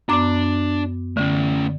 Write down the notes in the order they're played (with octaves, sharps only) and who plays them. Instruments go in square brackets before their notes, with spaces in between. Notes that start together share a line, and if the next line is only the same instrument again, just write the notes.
[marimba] F#2 B3 D6 [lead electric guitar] D4 D5
[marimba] D3 [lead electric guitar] A3 C#4